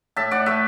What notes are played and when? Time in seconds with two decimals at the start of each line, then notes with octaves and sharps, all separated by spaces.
0.16 A2 E5 A5
0.31 A2 D5 F#5
0.46 A3 B4 E5